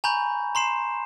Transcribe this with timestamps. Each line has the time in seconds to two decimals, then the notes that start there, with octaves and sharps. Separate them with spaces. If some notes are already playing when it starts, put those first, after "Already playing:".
0.04 G#5 A#5 B5 C#6 G6
0.55 A#5 C6 C7 E7